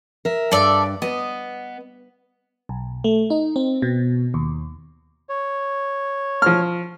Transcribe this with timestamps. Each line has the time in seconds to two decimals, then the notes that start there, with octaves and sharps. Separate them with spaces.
0.25 A#4 E5
0.52 G2 A4 D5 E5
1.02 B3 D#5
2.69 B1
3.04 A3
3.30 D#4
3.56 C4
3.82 B2
4.34 D#2
5.29 C#5
6.42 F3 F6